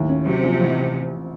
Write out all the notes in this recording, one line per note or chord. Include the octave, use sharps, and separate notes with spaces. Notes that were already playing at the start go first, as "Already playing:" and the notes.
Already playing: D#2 A2
C#4
C3 F#3
A#1
A1